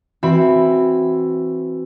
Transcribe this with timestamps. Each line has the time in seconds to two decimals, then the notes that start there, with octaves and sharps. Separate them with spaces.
0.23 E3 C4 F#4 E5 B5